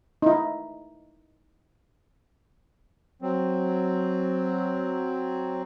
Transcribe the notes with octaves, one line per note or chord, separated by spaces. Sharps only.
D#4 E4
F#3 C4